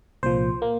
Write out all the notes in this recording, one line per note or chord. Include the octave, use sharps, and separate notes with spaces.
C2 A#2 F3 C5
A#3